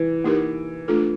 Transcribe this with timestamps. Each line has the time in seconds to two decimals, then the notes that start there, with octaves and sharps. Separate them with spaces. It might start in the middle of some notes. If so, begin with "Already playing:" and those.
Already playing: E3
0.24 A#3 D#4 G4 A#4
0.88 A3 D4 F4 A4